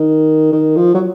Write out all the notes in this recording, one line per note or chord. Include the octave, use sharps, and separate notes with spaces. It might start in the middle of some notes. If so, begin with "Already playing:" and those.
Already playing: D#3
D#3
F3
F#3